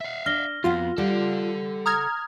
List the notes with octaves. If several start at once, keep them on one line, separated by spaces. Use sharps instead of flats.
E5 F5
D4 F6 A#6 G7
F2 B3 F4 F#4 F5
G3 A4 F#5
A#5 D#6 F6 G#6